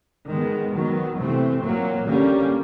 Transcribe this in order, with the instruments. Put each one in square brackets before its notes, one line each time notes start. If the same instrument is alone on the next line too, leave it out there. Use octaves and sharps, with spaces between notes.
[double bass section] D#3 G#3 B3
D#3 F#3 B3
C3 E3 A3 C4
A#2 F#3 A#3
D3 G3 A#3 C#4